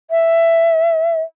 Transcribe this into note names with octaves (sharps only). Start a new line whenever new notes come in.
E5